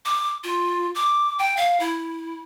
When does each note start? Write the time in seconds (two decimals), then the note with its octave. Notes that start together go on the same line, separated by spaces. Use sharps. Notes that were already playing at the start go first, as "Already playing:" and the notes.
0.05 D6
0.44 F4
0.95 D6
1.39 G5
1.57 F5
1.80 E4